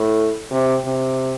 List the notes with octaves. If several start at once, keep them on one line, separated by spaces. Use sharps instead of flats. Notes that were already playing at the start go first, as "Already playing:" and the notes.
Already playing: A2
C3
C3